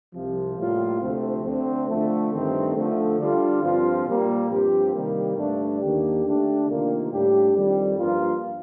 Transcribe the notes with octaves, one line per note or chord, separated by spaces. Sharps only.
C2 C3 F3
A2 G3 A#3 F4
D2 C3 F3 A3 C4
D2 D3 A3 C4
D3 F3 A3
G2 D#3 A3 C4
D3 F3 A3
D3 G3 D4 F4
G2 F3 C4 F4
A#2 G3 A#3
G2 F3 C4 G4
C3 D#3 G3 A#3
G2 D3 A3 D4
D#2 D#3 A#3 D4 G4
D3 A3 D4 G4
D2 C3 D#3 A#3 F4
A2 G3 D4 G4
F2 D#3 G3
G2 F3 A#3 F4